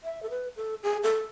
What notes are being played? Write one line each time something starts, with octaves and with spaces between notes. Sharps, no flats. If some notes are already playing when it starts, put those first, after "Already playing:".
E5
A4
B4
A4
G#4
A4